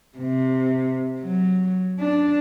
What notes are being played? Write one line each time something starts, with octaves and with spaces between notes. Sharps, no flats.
C3
F#3
D4